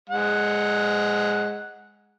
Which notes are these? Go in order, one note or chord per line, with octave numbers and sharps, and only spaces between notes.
G#3 F#5